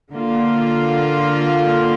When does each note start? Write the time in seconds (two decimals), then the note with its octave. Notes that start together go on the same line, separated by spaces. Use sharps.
0.12 D3 A#3 F4